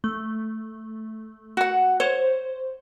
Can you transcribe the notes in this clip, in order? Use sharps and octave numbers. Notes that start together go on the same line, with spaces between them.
A3
F#4 F#5
C5 C#5